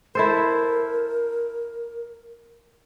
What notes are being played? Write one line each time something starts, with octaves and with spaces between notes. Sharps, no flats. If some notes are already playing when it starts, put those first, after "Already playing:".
E4 A4 A#4 C5